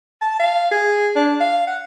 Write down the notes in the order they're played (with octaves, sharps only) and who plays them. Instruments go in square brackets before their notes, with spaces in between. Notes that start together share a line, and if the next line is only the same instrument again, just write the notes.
[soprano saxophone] A5
F5
G#4
D4
F5
F#5